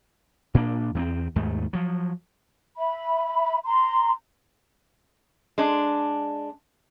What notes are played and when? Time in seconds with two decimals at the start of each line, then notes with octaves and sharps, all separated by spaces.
0.54 A#2 A#3 B3 D4
0.95 E2 B3 C4
1.36 D#2 G#2 A3
1.73 F3 F#3
2.77 E5 B5
3.65 A#5 C6
5.58 G#3 D4